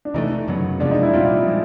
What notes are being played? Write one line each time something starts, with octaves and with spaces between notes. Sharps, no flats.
D4
C3 E3 A3 D#4
F#2 C#3 F#3 B3
E2 C3 F3 G#3 D4
D#4
E4
A#2 G3 C4 F4
F3 G#3